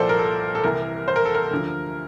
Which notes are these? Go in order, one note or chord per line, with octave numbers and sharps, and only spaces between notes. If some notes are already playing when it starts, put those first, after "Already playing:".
Already playing: C2 A#2 F3 A4 C5 D5
A#4
A4
A4
C2 C3 E3 A#4
C5
A#4
A4
A#4
D2 D3 F3